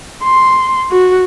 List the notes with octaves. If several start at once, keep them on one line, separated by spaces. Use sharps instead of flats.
C6
F#4